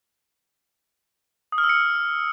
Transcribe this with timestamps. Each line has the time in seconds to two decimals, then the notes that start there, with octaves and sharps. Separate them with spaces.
1.52 D#6
1.58 F6
1.64 E6
1.69 C#7